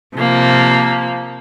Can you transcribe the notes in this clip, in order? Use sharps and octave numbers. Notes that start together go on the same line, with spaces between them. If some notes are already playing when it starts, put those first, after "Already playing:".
C3 F3 A#3